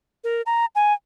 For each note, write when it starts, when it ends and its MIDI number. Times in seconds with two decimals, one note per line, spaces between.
0.24 0.42 70
0.46 0.66 82
0.75 0.93 80